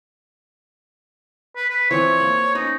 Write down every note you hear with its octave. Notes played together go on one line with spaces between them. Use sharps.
B4
B4
E3 F3 C4 C#5
A#3 B5
C#4 D#4 B4